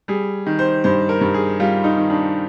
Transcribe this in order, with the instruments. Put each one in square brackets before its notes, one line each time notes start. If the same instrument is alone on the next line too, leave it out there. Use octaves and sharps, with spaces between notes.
[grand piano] G3 G#4
D#3
C5
G2 C5
A#4
G2
G#4
G3 F4
D#4
D#3
D4